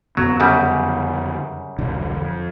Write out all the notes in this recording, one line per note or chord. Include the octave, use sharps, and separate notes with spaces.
F2 D3 F#3 B3
F#2 C#3 G3
E1 C2 D3
F2